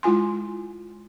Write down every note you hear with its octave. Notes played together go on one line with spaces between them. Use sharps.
G#3 E4 F4 G#5 C6